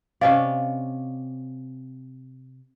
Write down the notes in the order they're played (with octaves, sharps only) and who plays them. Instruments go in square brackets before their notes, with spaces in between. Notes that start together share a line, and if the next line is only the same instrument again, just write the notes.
[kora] C3 C#4 D5 [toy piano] D#5 F5